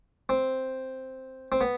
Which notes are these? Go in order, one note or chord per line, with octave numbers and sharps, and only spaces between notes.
C4
C4
B3